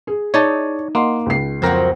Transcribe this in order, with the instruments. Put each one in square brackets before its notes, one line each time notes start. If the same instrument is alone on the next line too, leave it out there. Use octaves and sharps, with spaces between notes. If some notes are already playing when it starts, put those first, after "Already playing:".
[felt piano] G#4
[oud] D#4 [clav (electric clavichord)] C#5 D5 A5
[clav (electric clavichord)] A#3 [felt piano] D#5 F#5 C6
[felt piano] C#2 C7
[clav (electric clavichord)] F2 A#4 G5 [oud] F#3 A#3 C4